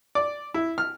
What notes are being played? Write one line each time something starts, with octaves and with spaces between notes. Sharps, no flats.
D5
E4
F6